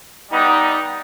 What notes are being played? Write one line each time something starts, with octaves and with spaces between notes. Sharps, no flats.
G3 B3 D#4